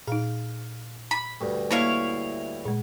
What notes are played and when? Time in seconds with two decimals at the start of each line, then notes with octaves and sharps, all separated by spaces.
0.08 A#2 D#4 F5
1.11 B5
1.41 D2 G2
1.71 A#3 E4 C#5 F5
2.66 A#2 G#3